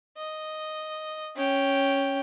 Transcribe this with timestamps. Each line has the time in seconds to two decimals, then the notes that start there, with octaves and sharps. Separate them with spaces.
0.17 D#5
1.36 C#4 G5